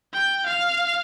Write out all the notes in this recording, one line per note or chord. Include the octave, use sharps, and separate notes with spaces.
G5
F5